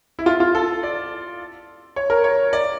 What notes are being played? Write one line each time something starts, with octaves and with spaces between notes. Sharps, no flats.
E4
F4
F4
A4
D5
C#5
A#4
C#5
D5